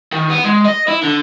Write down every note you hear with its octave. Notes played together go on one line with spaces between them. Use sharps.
D#3
B3
G#3
D#5
E4
D3